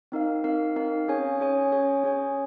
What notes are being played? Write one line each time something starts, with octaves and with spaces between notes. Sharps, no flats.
C4 D#4 A#4 F5
C4 D#4 A#4 F5
C4 D#4 A#4 F5
C#4 G#4 C#5 G#5
C#4 G#4 C#5 G#5
C#4 G#4 C#5 G#5
C#4 G#4 C#5 G#5